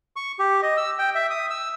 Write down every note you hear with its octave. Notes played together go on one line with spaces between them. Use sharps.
C#6
G4
D#5
E6
G5
E5
D#6
E6